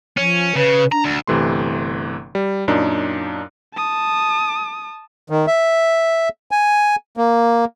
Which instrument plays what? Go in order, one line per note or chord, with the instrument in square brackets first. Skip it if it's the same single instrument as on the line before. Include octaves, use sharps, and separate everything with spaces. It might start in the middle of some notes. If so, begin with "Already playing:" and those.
[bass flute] F3 [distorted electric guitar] C#4
[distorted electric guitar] C#3 [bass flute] B4
[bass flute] D4 [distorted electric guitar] A#5
[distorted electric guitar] D2
[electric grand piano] G1 C3 E3 A3 C6
G3
F#2 A#2 D4 D#4
[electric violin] A5 D#6
[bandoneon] D#3
E5
G#5
A#3